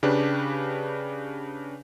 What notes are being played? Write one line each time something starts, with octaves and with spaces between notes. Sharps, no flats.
C#3 D4 G4 B4